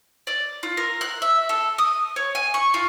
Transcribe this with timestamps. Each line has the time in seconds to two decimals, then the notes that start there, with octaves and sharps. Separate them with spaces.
0.27 D5
0.63 F4
0.77 A#4
1.01 F#6
1.22 E5
1.49 A4
1.78 D#6
2.16 C#5
2.35 G#5
2.54 C#6
2.74 F4